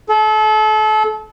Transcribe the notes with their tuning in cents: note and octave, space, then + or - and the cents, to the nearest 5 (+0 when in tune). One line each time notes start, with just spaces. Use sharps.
A4 -35